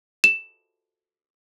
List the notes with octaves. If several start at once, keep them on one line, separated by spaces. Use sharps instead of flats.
E7